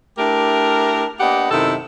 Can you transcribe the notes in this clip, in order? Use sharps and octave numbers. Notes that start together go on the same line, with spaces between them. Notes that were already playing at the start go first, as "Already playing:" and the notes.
A3 D4 E4 G4 A#4
A#3 B3 D4 G4 D#5 F#5
F#2 C3 D#3 D#4 E4 A4